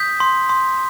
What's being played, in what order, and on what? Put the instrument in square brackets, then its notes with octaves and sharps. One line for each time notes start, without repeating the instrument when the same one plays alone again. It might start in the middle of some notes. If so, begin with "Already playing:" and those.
Already playing: [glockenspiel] D#6 G6 B6
C6
C6